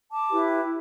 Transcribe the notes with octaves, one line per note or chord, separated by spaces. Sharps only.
A5 D6
E4 G4 B4